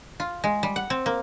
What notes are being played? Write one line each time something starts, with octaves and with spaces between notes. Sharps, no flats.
F4
G#3
G3
F#5
C4
A#3